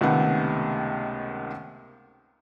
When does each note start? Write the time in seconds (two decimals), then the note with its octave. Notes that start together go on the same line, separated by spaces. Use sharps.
0.01 C#2 C3 D#3 A3 B3 F#5